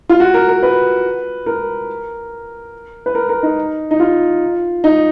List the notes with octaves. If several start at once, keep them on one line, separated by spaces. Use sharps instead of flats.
F4
F#4
A#4
A#4
B4
A#4
B4
A#4
A#4
D#4
D#4
F4
D#4